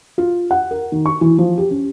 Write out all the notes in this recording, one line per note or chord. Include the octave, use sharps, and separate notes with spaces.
F4
F#5
A#4
D#3
C#6
E3
F3
G4
C#4